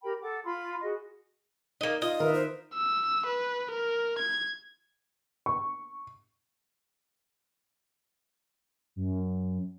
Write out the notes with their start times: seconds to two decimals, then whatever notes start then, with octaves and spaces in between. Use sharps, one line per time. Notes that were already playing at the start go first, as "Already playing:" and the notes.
0.03 G4 A#4 G5 B5
0.21 A4 F#5 D6
0.44 F4 B5 C6
0.83 F#4 G#4 D#5
1.81 A#3 D#4 A#4 D#5
2.02 F4 D#5
2.20 D#3 A#4 B4 E5
2.34 C5
2.74 E6
3.26 B4
3.71 A#4
4.18 G#6
5.46 C#6
8.96 F#2